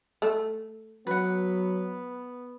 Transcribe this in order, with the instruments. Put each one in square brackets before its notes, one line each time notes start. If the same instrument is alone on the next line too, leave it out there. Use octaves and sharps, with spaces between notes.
[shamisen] A3
[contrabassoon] F#3 [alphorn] B3 [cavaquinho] B4 F#5